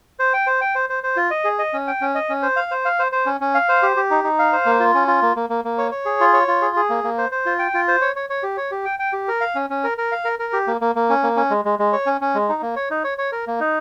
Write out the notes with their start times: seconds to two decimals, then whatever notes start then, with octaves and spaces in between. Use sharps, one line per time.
0.19 C5
0.33 G5
0.47 C5
0.61 G5
0.75 C5
0.90 C5
1.04 C5
1.17 F4
1.31 D#5
1.44 G#4
1.59 D#5
1.73 C#4
1.87 G5
2.01 C#4
2.15 D#5
2.29 C#4
2.43 C5
2.56 F5
2.71 C5
2.85 F5
2.99 C5
3.12 C5
3.26 C#4
3.41 C#4
3.54 F5
3.69 C5
3.83 G4
3.97 G4
4.10 D#4
4.24 D#4
4.39 F5
4.53 C5
4.66 A#3
4.80 F4
4.94 C#4
5.08 F4
5.22 A#3
5.36 A#3
5.50 A#3
5.65 A#3
5.78 C#5
5.91 C#5
6.05 G#4
6.21 F4
6.33 C#5
6.48 F4
6.62 G#4
6.76 G#4
6.90 A#3
7.04 A#3
7.18 C5
7.32 C5
7.46 F4
7.59 G5
7.74 F4
7.88 C5
8.01 C#5
8.16 C#5
8.30 C#5
8.43 G4
8.57 C#5
8.71 G4
8.85 G5
8.99 G5
9.13 G4
9.28 A#4
9.41 F5
9.55 C#4
9.70 C#4
9.84 A#4
9.98 A#4
10.12 F5
10.25 A#4
10.39 A#4
10.53 G4
10.67 A#3
10.81 A#3
10.95 A#3
11.10 C#4
11.23 A#3
11.36 C#4
11.50 G#3
11.65 G#3
11.79 G#3
11.93 C#5
12.06 C#4
12.21 C#4
12.35 G#3
12.49 D#4
12.62 A#3
12.76 C#5
12.90 D#4
13.04 C#5
13.18 C#5
13.32 A#4
13.47 A#3
13.60 D#4